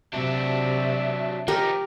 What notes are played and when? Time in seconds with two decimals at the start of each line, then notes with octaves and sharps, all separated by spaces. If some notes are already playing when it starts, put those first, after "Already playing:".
0.13 C3 F#3 D4 E5
1.48 F3 D#4 G4 A#4